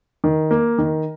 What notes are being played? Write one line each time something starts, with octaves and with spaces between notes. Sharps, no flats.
D#3
A#3
D#3